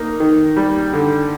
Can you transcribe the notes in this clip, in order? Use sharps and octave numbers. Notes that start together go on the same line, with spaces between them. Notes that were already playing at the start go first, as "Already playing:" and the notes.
Already playing: A#3 D#4
D#3
G3
D3